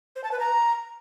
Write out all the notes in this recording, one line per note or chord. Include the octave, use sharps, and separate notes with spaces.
C5
A5
B4
A#5